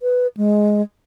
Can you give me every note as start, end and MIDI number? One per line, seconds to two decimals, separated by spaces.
0.01 0.27 71
0.37 0.82 56